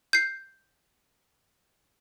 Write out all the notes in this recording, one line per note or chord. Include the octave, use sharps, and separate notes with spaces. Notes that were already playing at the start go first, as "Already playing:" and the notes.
G6 C7